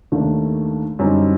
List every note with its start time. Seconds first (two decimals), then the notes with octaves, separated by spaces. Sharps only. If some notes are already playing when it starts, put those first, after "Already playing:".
0.12 D#2 D#3 A3 D4
0.99 F#2 D3 G3 C4 D#4